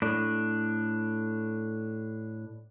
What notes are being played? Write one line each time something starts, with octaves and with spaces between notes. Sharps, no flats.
A2 D4